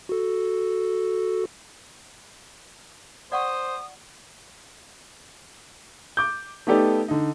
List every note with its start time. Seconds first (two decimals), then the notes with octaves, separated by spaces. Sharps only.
0.09 F#4 A4
3.32 C5 D5 F#5 C#6 D#6
6.17 D6 G6
6.67 A3 B3 D#4 G4 A4 D5
7.08 D3 D#4